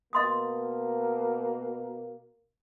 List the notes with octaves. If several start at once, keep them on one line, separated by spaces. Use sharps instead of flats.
B2 A#3 D#5 C6 D#6